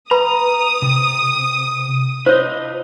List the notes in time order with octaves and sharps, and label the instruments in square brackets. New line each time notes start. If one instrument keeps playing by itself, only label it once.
[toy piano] B4 B5 [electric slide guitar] A#5 [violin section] D#6
[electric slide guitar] C3
[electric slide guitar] E4 F4 D#5 [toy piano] C5 C#5